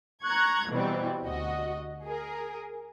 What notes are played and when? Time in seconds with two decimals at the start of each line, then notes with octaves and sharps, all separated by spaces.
0.24 A#5 C#6 F#6 G#6
0.69 B2 E3 G3 C4
1.23 D2 F#4 D#5
2.05 G#4 A#4